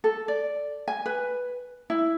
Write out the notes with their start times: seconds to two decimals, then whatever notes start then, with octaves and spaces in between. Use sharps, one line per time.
0.04 A4
0.28 D5
0.88 G#5
1.06 B4
1.90 E4